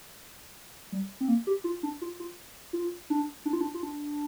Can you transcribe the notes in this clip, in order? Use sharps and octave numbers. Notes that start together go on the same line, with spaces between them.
G3
C4
A#3
G4
F4
D4
F4
F4
F4
D4
D4
F4
D4
F4
D4